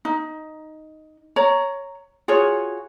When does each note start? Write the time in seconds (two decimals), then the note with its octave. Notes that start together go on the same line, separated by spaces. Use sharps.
0.05 D#4
1.36 C#5 A#5
2.28 F4 F#4 G#4 C#5